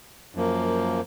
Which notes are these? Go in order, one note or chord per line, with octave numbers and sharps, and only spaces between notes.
F#2 F3 A#3